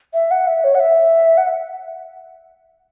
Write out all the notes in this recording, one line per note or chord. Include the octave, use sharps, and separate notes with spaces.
E5
F#5
E5
C#5
F#5
E5
F#5